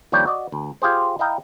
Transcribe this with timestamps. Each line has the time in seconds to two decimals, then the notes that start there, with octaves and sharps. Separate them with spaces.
0.12 D#2 F3 G3 D4 C#5 G5
0.26 F#4 D5 D#5
0.52 D2
0.82 F4 G4 G#4 C5
1.19 E4 D#5 F5 G5 A#5